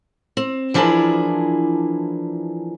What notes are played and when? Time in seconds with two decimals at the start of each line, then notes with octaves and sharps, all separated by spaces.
0.37 C4
0.74 E3 F3 D4 E4 G#4 A#4